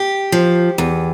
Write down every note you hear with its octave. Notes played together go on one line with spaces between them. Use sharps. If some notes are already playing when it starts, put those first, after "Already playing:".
Already playing: G4
F3
E2